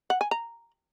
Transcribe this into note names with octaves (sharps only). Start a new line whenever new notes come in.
F#5
G#5
A#5